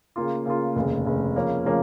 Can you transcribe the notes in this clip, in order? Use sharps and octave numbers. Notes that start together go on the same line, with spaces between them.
C#3 A#3 F4
C#3 A#3 F4
F1 D#2 C#3
F1 D#2 C#3
C#3 F3 A#3 C#4
C#3 F3 A#3 C#4